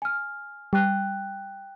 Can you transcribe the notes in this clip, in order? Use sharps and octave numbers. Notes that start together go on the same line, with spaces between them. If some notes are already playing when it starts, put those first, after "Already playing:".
G#5 F6
G3 G5 F#6